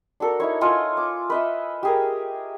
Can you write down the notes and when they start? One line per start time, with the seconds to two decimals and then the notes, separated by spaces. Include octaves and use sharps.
0.20 D4 F#4 A4 A#4
0.40 D#4 E4 C#5
0.61 F4 A4 D#5 G#5
0.97 D6
1.30 B4 D#5 E5
1.83 G4 G#4 A#4